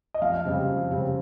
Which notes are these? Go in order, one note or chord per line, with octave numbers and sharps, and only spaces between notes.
D#5
F2 F5
C#3 G3 C4
F2
C#3 G3 C4